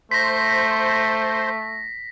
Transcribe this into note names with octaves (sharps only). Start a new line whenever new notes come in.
A3 C5 C6 A#6 B6